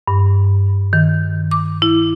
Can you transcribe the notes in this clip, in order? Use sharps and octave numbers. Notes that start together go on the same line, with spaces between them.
G2
D#3
D6
E4